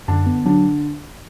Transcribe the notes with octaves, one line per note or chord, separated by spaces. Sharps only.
F#2 D3 D4
B3
D3 F#3 D4